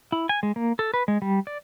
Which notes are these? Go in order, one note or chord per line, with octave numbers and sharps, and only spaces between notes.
E4
G#5
G#3
A#3
A4
B4
G#3
G3
D5